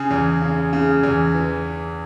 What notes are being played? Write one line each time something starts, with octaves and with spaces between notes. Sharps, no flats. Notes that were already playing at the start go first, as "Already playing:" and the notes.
Already playing: C#3 G#4
E2
C#3
C#3
E2
E3